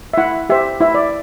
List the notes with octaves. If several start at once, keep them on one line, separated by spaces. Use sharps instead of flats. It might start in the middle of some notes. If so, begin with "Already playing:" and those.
E5
E4 F#5
G4 C5 E5
E4 E5
D5